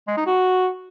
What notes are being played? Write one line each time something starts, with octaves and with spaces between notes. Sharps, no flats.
G#3
D#4
F#4